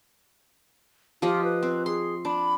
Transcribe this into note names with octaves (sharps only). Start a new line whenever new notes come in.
F3 F4 G4 D#5
B4
C4
G#4 C6
D4 B5